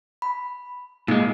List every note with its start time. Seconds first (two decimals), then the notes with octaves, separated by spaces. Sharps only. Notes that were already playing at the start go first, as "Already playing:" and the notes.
0.22 B5
1.08 A#2 G#3 D#4